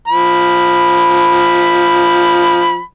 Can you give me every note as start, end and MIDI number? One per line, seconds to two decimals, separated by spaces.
0.08 2.80 53
0.08 2.80 83